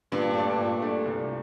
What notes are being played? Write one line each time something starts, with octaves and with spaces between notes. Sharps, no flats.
G2 A#2
A3 D4 A4 D5
A#2
A3 D4 A4 D5
C2